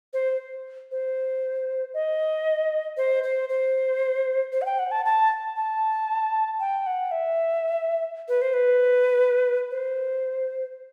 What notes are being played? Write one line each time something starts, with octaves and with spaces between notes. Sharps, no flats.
C5
C5
D#5
C5
C5
C5
C5
F#5
G5
F#5
A5
A5
A5
G5
F#5
E5
B4
C5
B4
C5